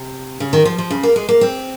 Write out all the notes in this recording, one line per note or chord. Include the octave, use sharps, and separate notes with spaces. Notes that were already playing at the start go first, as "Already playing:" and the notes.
Already playing: C3
C#3
D#3
F3
F3
C#3
A#3
G#3
A#3
C4